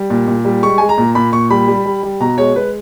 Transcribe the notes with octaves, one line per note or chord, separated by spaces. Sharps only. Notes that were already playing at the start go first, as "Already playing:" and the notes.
Already playing: G3
A#2
A#2
G3
G#3 C#6
G#3 G#5
A#5
A#2
A#2 B5
A#2 C#6
G3 B5
G3
G3
G3
B2 A#5
G#3 C#5
G#3 B4